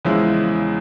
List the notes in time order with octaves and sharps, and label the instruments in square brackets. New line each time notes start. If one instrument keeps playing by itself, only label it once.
[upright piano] E2 C#3 F3 G#3 E4